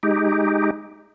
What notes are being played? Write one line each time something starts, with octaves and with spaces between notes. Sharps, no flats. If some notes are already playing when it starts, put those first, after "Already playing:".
G#3 D#4 G4